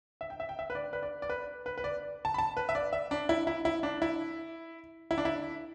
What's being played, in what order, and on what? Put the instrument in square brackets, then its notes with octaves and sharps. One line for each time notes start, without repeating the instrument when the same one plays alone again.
[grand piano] E5
G5
E5
G5
E5
B4
D5
B4
D5
D5
B4
B4
B4
D5
A5
B5
A5
B4
E5
D5
E5
D4
E4
E4
E4
D4
E4
E4
D4
E4